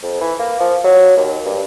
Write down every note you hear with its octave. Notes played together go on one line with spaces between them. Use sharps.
F2
E3
A#3
F3
F#3
D#2
G2